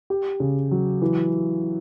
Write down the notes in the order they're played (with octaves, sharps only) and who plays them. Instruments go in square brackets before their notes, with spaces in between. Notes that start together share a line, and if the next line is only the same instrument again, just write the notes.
[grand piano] G4
C#3
F#3
E3